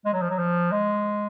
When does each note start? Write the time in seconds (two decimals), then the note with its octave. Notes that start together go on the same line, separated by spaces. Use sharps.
0.05 G#3
0.13 F#3
0.22 F3
0.30 F#3
0.38 F3
0.72 G#3